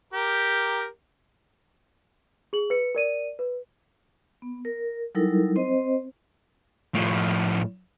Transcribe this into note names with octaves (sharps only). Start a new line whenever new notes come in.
G4 A#4
G#4 F#7
B4 C#7
A#4 D5 D#7
B4
B3
A#4
F#3 G3 D#4 E4 A4 A#4
C4 C5 D#5
A2 F3